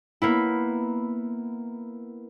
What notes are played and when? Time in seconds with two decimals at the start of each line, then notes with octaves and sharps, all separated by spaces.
0.22 A#3 B3 E4